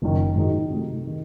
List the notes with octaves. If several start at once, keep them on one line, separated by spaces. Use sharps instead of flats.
F#1 F#2 D#3
G#2 D#3 G#3 D#4 F#4
C3 F#3 A3
D#3